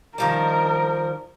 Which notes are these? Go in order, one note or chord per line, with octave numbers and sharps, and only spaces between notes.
D#3 F3 G3 A#4